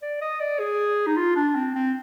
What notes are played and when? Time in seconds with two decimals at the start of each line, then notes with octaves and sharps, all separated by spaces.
0.02 D5
0.22 D#5
0.40 D5
0.60 G#4
1.07 D#4
1.17 F4
1.36 D4
1.55 C4
1.75 C4